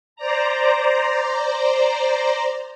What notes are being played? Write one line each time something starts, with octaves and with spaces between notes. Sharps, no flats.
C5 D5 A#5